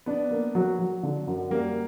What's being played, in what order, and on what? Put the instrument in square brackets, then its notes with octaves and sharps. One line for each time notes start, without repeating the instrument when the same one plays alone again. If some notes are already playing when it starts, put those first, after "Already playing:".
[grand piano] B3 [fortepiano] D4
[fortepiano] A#3
F#3
F#3
D3
F#2
[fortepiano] G3 [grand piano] A#3